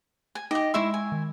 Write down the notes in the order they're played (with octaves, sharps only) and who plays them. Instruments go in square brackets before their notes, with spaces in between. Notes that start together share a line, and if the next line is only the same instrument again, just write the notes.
[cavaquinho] G#5
[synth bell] D#4 G5 D6 [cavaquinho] G4 D#5
[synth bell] G#3 C#6 E6 [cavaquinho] E4 E5 C6
[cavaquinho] G#5
[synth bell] D#3